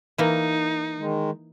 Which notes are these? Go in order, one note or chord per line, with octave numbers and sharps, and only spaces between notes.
E3 A#3 D#4
D#3 G#3